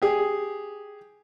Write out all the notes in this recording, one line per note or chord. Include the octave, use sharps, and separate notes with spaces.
G4 G#4